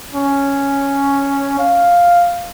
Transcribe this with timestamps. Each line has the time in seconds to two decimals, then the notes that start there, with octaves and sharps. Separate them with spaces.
0.15 C#4
1.59 F5